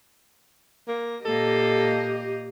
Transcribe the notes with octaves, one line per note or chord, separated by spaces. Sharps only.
A#3
A#2 A#3 G4 A4 D#5